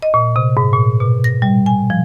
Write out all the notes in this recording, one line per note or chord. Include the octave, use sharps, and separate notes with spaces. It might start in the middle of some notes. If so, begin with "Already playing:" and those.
D#5
A#2
C3
G#2
A#2
B2
A#6
G3
G#5
F3